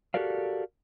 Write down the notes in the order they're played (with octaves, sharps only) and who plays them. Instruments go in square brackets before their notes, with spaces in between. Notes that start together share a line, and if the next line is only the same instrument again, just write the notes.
[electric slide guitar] F#4 G4 A4 A#4 D5 F5